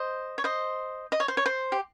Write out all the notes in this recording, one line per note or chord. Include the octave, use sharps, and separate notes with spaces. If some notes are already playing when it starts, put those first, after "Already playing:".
Already playing: C5 D#5
C#5
C5 D#5
D#5
C#5
C5
C#5
C5
G4